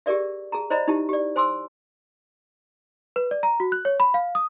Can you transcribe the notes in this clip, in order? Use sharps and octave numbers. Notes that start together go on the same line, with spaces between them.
G4 G#4 A#4 D5 E5
G#4 A5 A#5
C5 D5 D#5 A#5 B5
D#4 E4 G4 A5
G4 D5
C5 G#5 C6 D6 E6
B4
D5
A#5
F#4
F#6
C#5
B5
F5
D#6